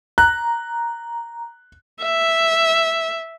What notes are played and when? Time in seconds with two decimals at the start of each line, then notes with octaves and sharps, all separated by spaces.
0.18 A#5 F#6
2.02 E5